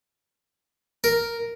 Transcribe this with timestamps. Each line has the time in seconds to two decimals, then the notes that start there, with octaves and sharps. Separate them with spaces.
1.04 A#4